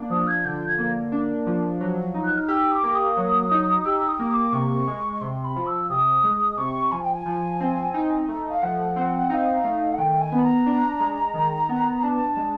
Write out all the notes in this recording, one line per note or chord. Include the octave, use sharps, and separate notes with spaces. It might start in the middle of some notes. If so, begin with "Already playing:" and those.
Already playing: A#3 D4
F3 D#6
G#6
D3 G6
G#6
A#3
D4
F3
F#3
D#4
F#6
F6
G4 E6
D6
A#3
D#6
F#3
D#4
G4 E6
D#6
A#3
D6
C3 C#6
G#3
C#6
C3 C6
B5
F3
E6
C3 D#6
G#3
C3 C#6
F3 G#5
G5
G#5
F3
C4
D#4
A3
F5
F3 F#5
C4
D#4 F5
A3
F#5
D#3 G5
G#5
B3
B5
A#5
D4
G#3
D#3
B3
D4 A5
G#3